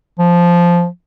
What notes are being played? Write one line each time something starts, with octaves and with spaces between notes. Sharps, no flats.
F3